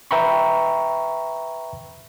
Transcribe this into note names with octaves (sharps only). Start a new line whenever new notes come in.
B4 E5 G5 A#5 B5 C#6